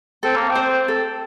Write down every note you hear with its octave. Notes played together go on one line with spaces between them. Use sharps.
C4 A4
A#3
C4
C5
A4